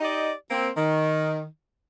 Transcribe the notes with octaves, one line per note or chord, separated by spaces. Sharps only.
D#4 G4 D5 D#5
A#3 C4
D#3